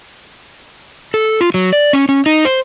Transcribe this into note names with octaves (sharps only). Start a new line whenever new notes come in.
A4
F4
F#3
D5
C#4
C#4
D#4
C5